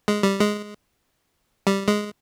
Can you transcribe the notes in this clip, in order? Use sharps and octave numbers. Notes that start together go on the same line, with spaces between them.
G#3
G3
G#3
G3
G#3